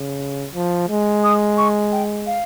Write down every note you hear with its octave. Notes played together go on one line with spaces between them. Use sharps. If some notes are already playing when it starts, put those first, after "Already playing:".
Already playing: C#3
F3
G#3
D#6
C#6
G5
F5